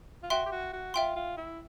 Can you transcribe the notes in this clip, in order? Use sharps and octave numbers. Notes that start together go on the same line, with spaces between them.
F4
F#4 E5 G5 C6
G4
F#4
F#4
F4 E5 G5 C6
F4
E4